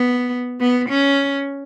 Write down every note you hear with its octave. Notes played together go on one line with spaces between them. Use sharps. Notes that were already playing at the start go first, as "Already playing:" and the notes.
Already playing: B3
B3
C#4